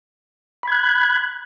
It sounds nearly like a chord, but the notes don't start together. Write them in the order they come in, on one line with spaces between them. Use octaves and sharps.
B5 G#6 F#6